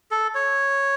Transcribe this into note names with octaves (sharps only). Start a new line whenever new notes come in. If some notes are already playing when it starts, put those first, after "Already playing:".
A4
C#5